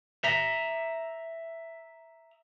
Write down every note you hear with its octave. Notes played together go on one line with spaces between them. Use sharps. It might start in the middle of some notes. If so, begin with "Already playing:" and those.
E5 A#5